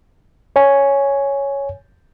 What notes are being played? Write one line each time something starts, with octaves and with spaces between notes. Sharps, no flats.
C#5 G#5